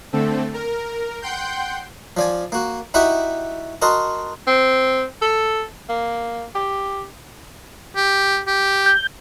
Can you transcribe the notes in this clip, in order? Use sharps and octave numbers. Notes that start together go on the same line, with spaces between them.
D3 A3 C4 A4
A#4
F#5 G5 C6 G6
F3 D5 G#5
A#3 F#4
D#4 E4 F#4 G4 E5 F#5
F#4 A#4 D#5 A5 C6
C4
A4
A#3
G4
G4
G4
G6